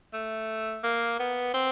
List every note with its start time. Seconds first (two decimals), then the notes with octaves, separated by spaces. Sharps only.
0.13 A3
0.84 A#3
1.20 B3
1.54 C4